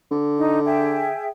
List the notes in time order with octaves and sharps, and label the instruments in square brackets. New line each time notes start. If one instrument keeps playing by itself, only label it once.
[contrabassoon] D3
[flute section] D#4
G#4 E5 G5